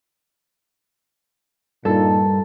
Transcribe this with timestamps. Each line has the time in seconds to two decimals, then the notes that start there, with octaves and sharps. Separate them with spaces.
1.85 G2 A#2 D#4 A4